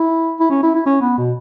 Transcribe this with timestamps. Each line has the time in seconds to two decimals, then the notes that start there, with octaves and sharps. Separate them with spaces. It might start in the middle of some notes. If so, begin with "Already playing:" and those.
Already playing: E4
0.40 E4
0.50 C#4
0.63 E4
0.75 E4
0.86 C#4
1.01 B3
1.18 B2